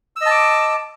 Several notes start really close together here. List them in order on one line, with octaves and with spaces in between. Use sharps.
E6 D#5 A5 D6